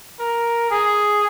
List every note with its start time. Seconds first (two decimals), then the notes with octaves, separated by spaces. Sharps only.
0.20 A#4
0.71 G#4